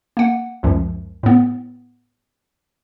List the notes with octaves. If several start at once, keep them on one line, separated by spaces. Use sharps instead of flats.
A#3 F#5
C#2 F#2 F3
A2 B3